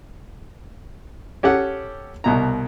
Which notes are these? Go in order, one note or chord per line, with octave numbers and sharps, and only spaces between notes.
C#4 G4 A4 F#5
C2 B2 A#5